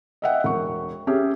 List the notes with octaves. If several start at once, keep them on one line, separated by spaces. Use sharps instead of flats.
D#5 E5 F#5 G5
E1 C#6
C#4 G4 G#4 E5